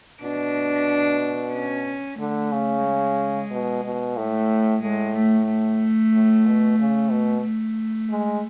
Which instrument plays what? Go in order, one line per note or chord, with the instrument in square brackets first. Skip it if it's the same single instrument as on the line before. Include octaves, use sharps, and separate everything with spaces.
[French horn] B2 [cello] D4
[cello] C#4
[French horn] D3 [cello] A3
[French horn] C#3
[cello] G#3
[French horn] B2
B2
[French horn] A2 [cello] A3
[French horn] A2 [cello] G#3
[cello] A3
A3
[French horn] A2
B2
C#3
B2
[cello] A3
[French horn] G#3